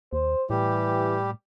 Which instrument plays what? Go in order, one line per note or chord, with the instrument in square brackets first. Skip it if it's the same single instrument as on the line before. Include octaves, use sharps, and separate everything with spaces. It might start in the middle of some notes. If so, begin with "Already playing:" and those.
[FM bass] D#2 [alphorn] C5
[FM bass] A2 [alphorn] E3 [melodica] G3 G4